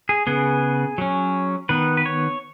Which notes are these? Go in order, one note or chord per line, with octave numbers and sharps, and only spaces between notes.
G#4
C#3 B3 G#4
F#3 C#4
D#3 B3 B4
B4
C#5